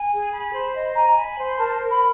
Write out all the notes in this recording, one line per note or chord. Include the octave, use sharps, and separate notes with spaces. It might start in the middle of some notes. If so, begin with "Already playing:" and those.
Already playing: G#5
G#4
B5
C5
D#5
G#5 A#5
B5
C5
A#4 A5
A#4
B5